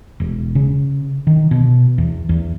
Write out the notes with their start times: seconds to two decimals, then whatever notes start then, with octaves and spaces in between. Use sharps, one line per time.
0.20 E1
0.55 C#3
1.27 D#3
1.51 B2
1.98 E2
2.29 E2